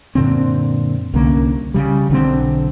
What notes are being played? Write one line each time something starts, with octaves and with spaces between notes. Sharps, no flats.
F#2 A#2 D3 C4
C2 D3 A#3 C#4
C#3 G3
B1 D3 E3 C4